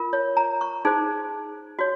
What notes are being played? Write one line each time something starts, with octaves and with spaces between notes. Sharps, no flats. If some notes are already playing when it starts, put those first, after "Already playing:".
Already playing: F4 A#4
C#5
A#5
C#6
D#4 G#4 C5
F#4 C#5